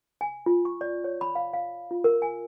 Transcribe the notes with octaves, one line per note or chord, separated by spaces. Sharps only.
G#5
F4
C#6
D5
C#5
B5
F5
F5
F4
A#4
G#5